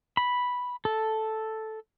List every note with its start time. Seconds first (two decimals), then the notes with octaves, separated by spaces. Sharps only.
0.17 B5
0.85 A4